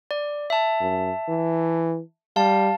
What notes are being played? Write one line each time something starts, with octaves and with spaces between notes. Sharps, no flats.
D5
E5 A5
F#2
E3
G3 F5 A5